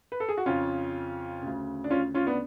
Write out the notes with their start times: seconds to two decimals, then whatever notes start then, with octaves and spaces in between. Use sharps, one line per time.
0.12 B4
0.20 A4
0.29 G#4
0.37 F#4
0.46 F2 C#3 C#4 F4
1.42 D2 C#3
1.84 D4
1.90 C#4 F4
2.14 C#4 F4
2.27 B3 D4